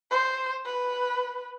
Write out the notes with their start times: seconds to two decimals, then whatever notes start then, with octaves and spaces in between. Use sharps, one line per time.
0.11 C5
0.66 B4